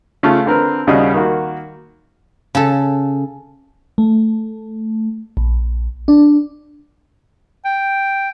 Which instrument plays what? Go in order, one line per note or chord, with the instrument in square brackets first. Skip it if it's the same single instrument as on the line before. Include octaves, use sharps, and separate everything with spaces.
[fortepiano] C#3 A3 F4 C#6
D3 C4 A#4 B4
D#2 C#3 G3 F#4 D#5 D#6
D#3 A#3 F#4
[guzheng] C#3 A4
[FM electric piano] A3
A#1
D4
[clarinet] G5